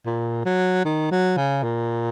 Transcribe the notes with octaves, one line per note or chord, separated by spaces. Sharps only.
A#2
F#3
D#3
F#3
C#3
A#2